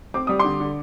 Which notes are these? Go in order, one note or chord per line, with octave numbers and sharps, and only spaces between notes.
C4 D6
G3 D#6
D3 C6 D6
D3